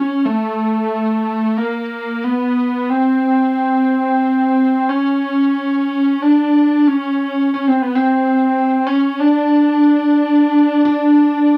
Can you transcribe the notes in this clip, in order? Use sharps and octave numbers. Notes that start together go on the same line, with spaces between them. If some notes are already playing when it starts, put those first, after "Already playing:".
Already playing: C#4
A3
A#3
B3
C4
C#4
D4
C#4
C#4
C4
B3
C4
C#4
D4
D4